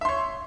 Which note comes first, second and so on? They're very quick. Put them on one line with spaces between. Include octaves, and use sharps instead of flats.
E5 C6 C#5